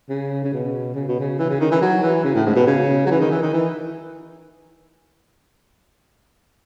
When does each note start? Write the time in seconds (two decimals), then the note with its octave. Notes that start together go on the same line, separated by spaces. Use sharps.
0.10 C#3
0.44 C#3
0.53 B2
0.95 C#3
1.08 B2
1.20 C#3
1.39 E3
1.50 C#3
1.60 D#3
1.71 E3
1.82 F#3
2.03 E3
2.24 C#3
2.35 A2
2.46 G#2
2.56 B2
2.67 C#3
3.06 F#3
3.11 E3
3.21 D#3
3.31 E3
3.43 D#3
3.53 E3